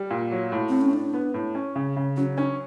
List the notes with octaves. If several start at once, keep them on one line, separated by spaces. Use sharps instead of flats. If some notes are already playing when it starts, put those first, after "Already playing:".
Already playing: G3
A#2
F#3
A2
A2 C4
C#4
A2 D4
B3
A2
C#4
C#3
C#3
F#3 C#4
C#4 D4